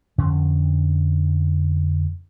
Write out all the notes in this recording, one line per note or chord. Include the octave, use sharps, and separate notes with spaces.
F2 D3 C#4